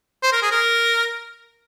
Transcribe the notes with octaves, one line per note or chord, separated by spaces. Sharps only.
C5
A#4
G#4
A#4